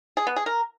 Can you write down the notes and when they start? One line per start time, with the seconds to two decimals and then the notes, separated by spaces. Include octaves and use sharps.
0.17 G#4
0.27 B3
0.36 G#4
0.46 A#4